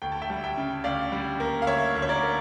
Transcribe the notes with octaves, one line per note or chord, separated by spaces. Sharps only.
D2 G5
A5
E5 G5
G3
E5 G5
C#3
D2 D5 F5
G3
A#3
F5
D2 C#5 E5
D2
C#5
A#4 D5
A#3